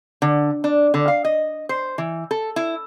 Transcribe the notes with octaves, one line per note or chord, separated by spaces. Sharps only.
D3
D4
D3
F5
D#5
C5
E3
A4
E4